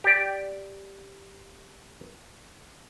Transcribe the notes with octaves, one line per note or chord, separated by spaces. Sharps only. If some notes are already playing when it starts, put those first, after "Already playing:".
G4 D5